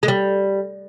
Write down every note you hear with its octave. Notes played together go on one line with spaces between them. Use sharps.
G#3
G3